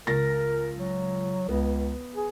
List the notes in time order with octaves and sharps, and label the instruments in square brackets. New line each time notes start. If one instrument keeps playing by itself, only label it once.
[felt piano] C#2 A6 A#6 [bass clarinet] A#4
[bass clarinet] F#3
[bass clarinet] C#2 [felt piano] B3
[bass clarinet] G#4